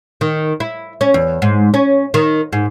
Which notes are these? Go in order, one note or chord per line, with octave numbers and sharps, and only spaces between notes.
D#3
E4
C#4
E2
G#2
C#4
D#3
G#2